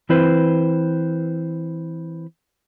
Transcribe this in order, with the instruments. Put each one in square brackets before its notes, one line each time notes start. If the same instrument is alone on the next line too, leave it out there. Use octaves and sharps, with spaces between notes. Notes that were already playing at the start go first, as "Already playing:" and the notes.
[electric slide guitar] E3 C4 E4 B4 C5